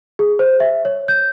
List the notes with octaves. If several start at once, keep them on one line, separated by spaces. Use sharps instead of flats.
G#4
C5
E5
C#5
G6